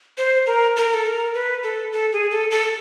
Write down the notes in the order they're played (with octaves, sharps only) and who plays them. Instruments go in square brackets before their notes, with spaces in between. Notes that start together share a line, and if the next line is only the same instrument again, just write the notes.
[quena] C5
A#4
A#4
A4
A#4
B4
A4
A4
G#4
A4
A4